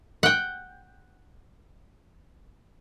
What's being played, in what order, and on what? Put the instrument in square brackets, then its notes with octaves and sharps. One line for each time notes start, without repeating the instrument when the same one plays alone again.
[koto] F#5 G5